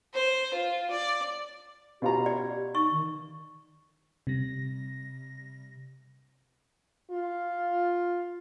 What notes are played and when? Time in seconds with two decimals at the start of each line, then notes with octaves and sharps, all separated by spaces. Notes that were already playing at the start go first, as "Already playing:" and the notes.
0.14 C5
0.54 F4
0.91 D5
2.02 B2 F4 G4 A#5
2.26 D5
2.75 D#4 C#6
2.92 D#3
4.27 C3 G3 A#6
7.11 F4